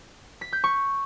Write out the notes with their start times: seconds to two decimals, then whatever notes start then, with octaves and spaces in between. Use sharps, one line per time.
0.41 B6
0.53 G6
0.64 C#6